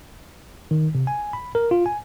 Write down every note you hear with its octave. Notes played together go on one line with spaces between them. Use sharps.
D#3
C3
G#5
B5
A#4
F4
G#5